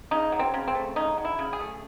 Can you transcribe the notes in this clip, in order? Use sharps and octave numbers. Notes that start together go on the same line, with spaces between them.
C#3 D#4
F#3
C4
C#3
C4
A3
C#3 D#4
F#3
E4
C#3
G#4
A3